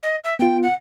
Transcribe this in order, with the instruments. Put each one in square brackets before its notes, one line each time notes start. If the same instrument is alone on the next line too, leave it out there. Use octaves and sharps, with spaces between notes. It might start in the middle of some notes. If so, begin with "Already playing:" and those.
[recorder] D#5
E5
[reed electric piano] B3 F4 [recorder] G5
[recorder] F#5